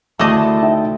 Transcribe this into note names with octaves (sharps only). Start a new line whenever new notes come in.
D2 A3 E4 G#4 D#5 A5 D6
D#4 E5 G5